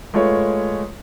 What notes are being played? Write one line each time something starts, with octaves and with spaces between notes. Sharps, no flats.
G#3 A3 F4 B4 C#5